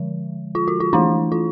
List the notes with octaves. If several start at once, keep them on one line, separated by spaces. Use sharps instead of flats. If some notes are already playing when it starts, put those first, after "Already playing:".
Already playing: D3 F3 G#3
F4
F#4
F4
E3 A3 D4 E4
F4